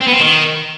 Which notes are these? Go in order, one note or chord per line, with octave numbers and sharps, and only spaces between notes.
C4
B3
C4
D#3